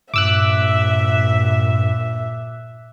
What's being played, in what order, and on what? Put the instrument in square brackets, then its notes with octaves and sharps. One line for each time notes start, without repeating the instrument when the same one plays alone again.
[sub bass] G2 [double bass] A#2 [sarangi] E5 [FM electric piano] D6 E6 F#6